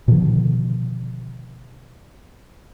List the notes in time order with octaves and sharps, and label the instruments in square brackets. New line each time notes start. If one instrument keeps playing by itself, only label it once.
[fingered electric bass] B2 D3 D#3 F3